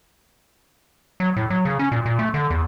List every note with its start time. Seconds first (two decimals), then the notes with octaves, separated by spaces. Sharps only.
1.20 F#3
1.36 A2
1.50 F#3
1.65 C#3
1.79 C#4
1.92 A#2
2.06 A#2
2.19 A3
2.34 D3
2.50 E2